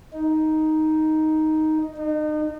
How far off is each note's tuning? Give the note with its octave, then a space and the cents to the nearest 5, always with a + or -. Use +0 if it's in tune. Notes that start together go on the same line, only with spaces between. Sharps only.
D#4 +5
D#4 -35